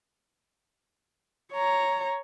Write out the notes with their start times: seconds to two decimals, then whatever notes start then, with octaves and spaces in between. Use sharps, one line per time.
1.53 C#5 A#5